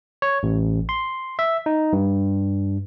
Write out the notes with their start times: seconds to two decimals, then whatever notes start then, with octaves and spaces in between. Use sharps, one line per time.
0.22 C#5
0.43 A1
0.89 C6
1.39 E5
1.66 D#4
1.93 G2